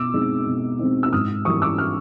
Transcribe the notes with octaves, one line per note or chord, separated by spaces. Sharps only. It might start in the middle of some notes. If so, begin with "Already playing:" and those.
Already playing: B2 D6 E6
G#3 C4 D#4
B2
G#3 C4 D#4
E6
G#2 D#6 F6
E3 G3 C#6 D#6
D6 E6
F6